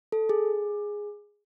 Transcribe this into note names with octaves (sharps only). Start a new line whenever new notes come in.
A4
G#4